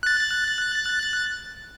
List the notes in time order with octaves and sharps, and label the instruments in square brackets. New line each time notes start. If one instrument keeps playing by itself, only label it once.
[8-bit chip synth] F#6 A6